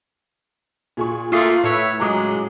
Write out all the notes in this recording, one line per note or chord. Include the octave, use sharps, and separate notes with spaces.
A#2 G#4 C#6
A3 A#3 F4 C#6 D#6 C7
A2 B4 C#5 E5
C#3 F#3 G#3 A#5 D6 D#6